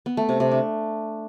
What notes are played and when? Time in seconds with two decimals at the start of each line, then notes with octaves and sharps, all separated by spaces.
0.06 B3
0.17 A3
0.29 C3
0.40 C3
0.51 D4